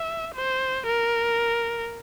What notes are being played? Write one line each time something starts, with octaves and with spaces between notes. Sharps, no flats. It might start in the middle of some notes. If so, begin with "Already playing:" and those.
Already playing: E5
C5
A#4